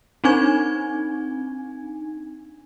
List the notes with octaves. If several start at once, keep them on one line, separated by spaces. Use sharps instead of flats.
C4 D4 D#4 G#5 G#6